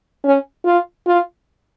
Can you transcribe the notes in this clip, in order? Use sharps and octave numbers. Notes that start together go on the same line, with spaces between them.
C#4
F4
F4